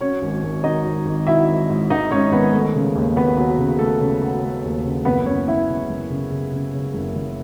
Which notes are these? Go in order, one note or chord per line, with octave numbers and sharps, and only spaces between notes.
F#3 C#4 C#5
G#1
G#1
F#3 D#4 D#5
G#1
G#1
F#3 E4 E5
G#1
G#2
G#1 D#4 D#5
G#2 C#4 C#5
G#1 B3 B4
A3
C#3
D#2
D#2 B3 B4
F#3
C#3
A3 A4
C#3
F#3
A3
D#2
C#3
F#1 B3 B4
F#1 C#4 C#5
F#1 E4 E5
C#3
F#1
C#3
C#3
C#3
C#3
F#1
F#1